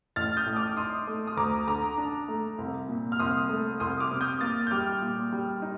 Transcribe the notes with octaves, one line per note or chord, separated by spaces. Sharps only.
A1 F6 A6
D#6 G6
A2
D6 F6
D#4 C6 D#6
A3
D#6
D2 A#5 D6
D3 A#5 D6
D4
A3
C2
A#2
F6
C2 C6 D#6
A3
C2 C6 D#6
D6 F6
C3
D#6 G6
A#3 F6 A6
G6
G3 D6 F6
A#2
G3
D#4